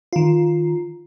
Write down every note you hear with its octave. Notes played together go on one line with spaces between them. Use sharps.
D#3 F4